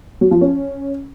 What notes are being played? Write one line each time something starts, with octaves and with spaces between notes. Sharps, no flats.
F#3
F3
C#4